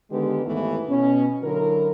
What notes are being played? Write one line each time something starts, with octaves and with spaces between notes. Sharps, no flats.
D3 D#3 G#3 B3 G4 B4
D#2 G#2 E3 A3 B3 A4
B2 C#4
D3 F#3 E4 A#4